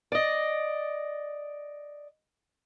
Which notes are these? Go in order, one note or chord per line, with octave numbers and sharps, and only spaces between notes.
D5 D#5